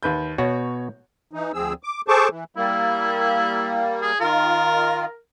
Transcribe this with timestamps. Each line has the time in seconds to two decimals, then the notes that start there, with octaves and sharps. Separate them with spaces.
0.03 D#2 B4 G6
0.38 B2 F#4 C#5
1.33 E3 D#4
1.54 D2 F3 C4 G#4 E6
1.83 D6
2.08 G#4 A4 C5 A5 C#6 D6
2.29 E3
2.57 G3 A#3 E4
4.02 G#4
4.20 D#3 F4 A#4